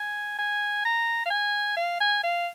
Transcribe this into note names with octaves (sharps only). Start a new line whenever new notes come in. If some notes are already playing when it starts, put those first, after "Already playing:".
Already playing: G#5
G#5
A#5
F5
G#5
F5
G#5
F5